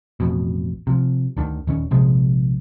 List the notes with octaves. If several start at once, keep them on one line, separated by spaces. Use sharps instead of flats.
A1 F2 B2
C3 F3
D2 D3 D#3
D#1 D#3 C#4
A#1 C3 F3 G#3